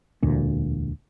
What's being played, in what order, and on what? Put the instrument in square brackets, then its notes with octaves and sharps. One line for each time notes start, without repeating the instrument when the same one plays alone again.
[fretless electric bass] E1 D2 A#2